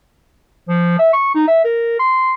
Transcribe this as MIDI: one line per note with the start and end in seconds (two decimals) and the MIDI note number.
0.69 0.95 53
0.99 1.09 76
1.13 1.33 85
1.35 1.43 63
1.48 1.64 76
1.65 1.96 70
1.99 2.34 84